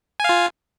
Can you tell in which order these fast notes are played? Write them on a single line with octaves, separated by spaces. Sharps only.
G#5 F5 F4